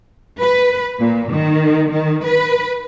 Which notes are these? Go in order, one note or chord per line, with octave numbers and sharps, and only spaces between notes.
B4
A#2
D#3
D#3
B4